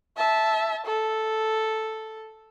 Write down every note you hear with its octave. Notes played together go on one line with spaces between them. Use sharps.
E5 A5
A4